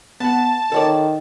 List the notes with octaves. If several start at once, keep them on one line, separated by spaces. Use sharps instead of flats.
B3 F#5 A5
D#3 A4 C#5 D5